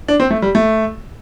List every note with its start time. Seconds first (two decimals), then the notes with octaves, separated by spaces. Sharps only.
0.08 D4
0.20 C4
0.30 A3
0.42 G3
0.55 A3